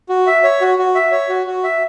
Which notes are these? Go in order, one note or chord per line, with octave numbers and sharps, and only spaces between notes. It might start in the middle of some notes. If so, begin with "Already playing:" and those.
F#4
E5
C#5
F#4
F#4
E5
C#5
F#4
F#4
E5